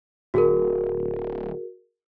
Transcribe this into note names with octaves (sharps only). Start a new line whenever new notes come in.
D1 F#4 G#4 A#4